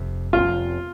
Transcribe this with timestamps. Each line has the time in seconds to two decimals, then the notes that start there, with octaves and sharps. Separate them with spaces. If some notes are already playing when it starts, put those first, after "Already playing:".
Already playing: F1 F2 C3
0.33 F1 F2 C3 F4